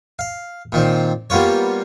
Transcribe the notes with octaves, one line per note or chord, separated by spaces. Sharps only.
F5
A#2 D#3 C4
G3 A#3 B3 F4 C#5